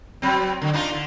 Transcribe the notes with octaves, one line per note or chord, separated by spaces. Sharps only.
F#3 C4
D3
D4 D#4 F4
D3